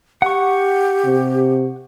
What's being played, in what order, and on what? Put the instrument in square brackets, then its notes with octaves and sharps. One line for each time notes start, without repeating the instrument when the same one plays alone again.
[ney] G4 [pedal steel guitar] F#5 C#6
[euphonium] C3